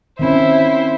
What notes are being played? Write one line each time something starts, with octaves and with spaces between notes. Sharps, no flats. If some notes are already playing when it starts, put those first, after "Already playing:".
D#3 C4 C#4 E4 C5